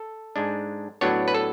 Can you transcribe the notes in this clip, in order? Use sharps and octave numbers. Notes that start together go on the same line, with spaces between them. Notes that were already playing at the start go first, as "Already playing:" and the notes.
Already playing: A4
G#2 G#3 D4
A2 F#3 B3 D4 C#5
B4
A4